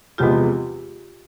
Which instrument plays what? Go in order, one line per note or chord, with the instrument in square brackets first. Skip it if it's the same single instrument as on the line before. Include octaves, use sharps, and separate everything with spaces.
[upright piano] E2 C3 F3 G#3 B3 [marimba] F4 G4